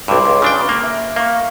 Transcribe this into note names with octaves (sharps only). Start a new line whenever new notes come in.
B1 G2 C6 D6 E6
C#2
C#3 D4 G5
A#3
E5
A#3 F5 C#6